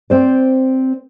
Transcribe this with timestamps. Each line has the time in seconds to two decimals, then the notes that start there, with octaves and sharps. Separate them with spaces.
0.10 C4 C5 D5